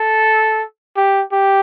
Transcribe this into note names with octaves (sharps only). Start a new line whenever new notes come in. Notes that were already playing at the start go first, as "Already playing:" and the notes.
Already playing: A4
G4
G4